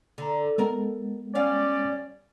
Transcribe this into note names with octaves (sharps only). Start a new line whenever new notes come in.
D3 A4 A#5
G#3 B3 A4 A#4
G3 C#4 D5 F5